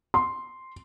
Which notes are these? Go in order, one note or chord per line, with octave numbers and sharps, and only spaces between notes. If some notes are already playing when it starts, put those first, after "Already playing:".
C6